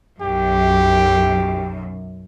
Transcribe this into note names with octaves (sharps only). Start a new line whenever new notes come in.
B1 F#2 G4